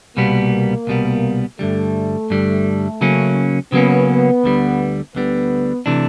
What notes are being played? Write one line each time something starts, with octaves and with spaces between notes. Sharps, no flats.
C2 B2 G3 A#3 B3
C2 B2 G3 B3
G2 D3 G3 A3
G2 D3 G3
C#3 F#3 A#3 C#4
C#3 F#3 A#3 B3 C#4
D2 D3 G3
D2 D3 G3 B3
C3 E3 A3 D4